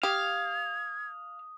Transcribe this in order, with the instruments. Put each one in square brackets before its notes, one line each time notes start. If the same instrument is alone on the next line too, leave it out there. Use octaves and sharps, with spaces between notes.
[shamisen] G4 [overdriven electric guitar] F5 [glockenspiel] D#6 [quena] G#6